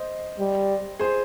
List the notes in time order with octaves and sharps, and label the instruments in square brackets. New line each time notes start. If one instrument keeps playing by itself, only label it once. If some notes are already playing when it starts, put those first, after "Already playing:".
Already playing: [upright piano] C5 D#5
[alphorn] G3
[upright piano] G#4 C5